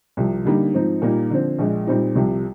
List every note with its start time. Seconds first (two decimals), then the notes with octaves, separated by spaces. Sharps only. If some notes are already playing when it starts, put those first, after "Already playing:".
0.17 C2 C3 F3
0.45 D3 G3 A#3 D#4
0.74 G#2 F3 C4 D#4
1.02 A#2 G3 A#3 D#4
1.30 D3 F3 C4
1.59 A#1 A#2 G#3
1.87 A#2 G3 C4 D#4
2.15 C2 C3 F3